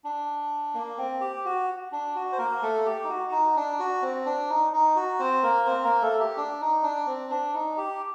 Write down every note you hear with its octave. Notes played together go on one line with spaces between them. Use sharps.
D4
A#3
C4
G4
F#4
D4
F#4
C5
A#3 A#4
A3 A4
G4
D#4
F#4
D#4
D4
F#4
C4
D4
D#4
D#4
F#4
C4 C5
A#3 A#4
C4 C5
A#3 A#4
A3 A4
G4
D4
D#4
D4
C4
D4
D#4
G4